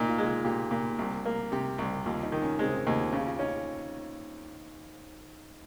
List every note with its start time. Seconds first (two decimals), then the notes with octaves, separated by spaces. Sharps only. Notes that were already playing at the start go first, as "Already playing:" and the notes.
Already playing: A#2 D#4
0.08 F4
0.18 G#3
0.27 F4
0.45 A#2 G4
0.71 A#2
0.99 C2
1.25 A#3
1.52 C3 G4
1.78 C2
2.06 D#2 F4
2.23 D#4
2.32 D#3
2.42 C#4
2.59 G#3 C4
2.72 D#4
2.86 D#2 D#4
2.99 F4
3.13 C#3
3.26 F4
3.39 C#4 D#4